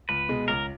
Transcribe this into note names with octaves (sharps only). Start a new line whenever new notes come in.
C#2 B4
B2 G#3
C#2 A#4